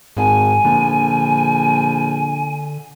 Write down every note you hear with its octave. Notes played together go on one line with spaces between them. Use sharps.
G#1 G#2 G#5
A#1 D3